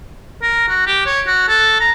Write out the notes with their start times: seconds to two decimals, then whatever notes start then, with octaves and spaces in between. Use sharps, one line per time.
0.42 A#4
0.69 F#4
0.87 G4
1.06 C#5
1.27 F#4
1.48 A4
1.80 A#5